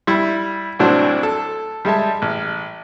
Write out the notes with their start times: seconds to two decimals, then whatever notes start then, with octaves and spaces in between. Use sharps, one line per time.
0.07 G3 E4
0.79 C2 A2 F#3 C4 D4
1.23 A4
1.85 G3 G#3 E5 A5
2.22 A1